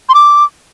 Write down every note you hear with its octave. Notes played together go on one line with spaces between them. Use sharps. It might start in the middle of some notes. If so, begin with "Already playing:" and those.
C6
D6